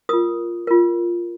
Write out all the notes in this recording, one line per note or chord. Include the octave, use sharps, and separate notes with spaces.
F4 A#4 D#6
F4 A#4